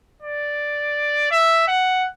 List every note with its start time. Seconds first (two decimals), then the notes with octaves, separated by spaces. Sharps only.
0.22 D5
1.31 E5
1.68 F#5